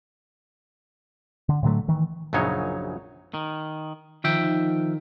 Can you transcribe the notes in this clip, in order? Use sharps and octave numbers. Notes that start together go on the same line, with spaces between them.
D3
A2 D3 F#3 A3
D#3 E3
A#1 F#2 C#3 F#3 D#4 C#5
D#3
D#3 F3 E5 G5